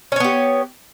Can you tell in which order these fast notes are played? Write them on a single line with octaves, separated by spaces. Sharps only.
C#4 C#5 B3 G4